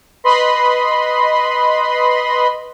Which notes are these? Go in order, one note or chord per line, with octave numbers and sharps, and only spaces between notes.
B4 D#5 B5 C6